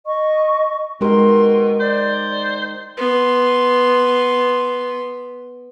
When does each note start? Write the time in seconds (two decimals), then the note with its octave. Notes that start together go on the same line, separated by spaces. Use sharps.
0.06 D#5 C#6
1.01 B2 D#3 G#3 D#4 G4 A#4 C6
1.80 C5 D5
2.97 B3 C6